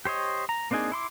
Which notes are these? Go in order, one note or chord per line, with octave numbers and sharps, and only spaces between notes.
G4 C5 C#5 D#5
A#5
A#3 C4 D4 D#4 G#4
E4 C6 D6